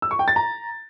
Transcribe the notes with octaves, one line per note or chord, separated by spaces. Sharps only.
E6
C#6
G5
A6
A#5